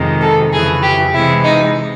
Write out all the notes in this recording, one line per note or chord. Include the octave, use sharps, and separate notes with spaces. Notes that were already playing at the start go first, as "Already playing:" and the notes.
Already playing: F2 C3 D#3 G#3
A4
F2 C#3 E3 G#4
G4
C3 E3 G#3 E4
D#4